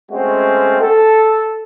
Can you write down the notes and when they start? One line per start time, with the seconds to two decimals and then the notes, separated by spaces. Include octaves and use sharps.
0.11 G#3 A3 C4 C#4 F#4
0.81 A4